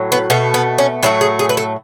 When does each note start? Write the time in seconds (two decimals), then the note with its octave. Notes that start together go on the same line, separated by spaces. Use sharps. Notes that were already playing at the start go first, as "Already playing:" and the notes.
Already playing: A2 F#3
0.12 B3
0.30 B2 A3 B3
0.54 B3
0.78 C#4
1.03 A2 F#3 A3 E4
1.21 G#4
1.39 G#4
1.49 B4
1.57 A4